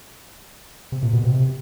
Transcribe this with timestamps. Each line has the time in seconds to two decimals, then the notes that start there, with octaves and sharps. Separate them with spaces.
0.92 C3
1.02 A#2
1.13 B2
1.24 C3